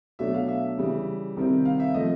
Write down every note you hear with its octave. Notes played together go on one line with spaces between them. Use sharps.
B2 F#3 A3 D4 E5
F5
E5
C#3 E3 G3
C3 D#3 G3 C4 E4
F5
E5
C3 F3 A3 D#5